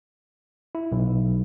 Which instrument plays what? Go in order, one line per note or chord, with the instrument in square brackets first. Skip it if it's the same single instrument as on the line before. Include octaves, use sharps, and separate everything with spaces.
[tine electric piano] E4
B1